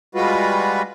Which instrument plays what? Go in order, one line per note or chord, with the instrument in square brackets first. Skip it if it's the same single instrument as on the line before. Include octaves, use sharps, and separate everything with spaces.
[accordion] G3 G#3 F4 F#4 B4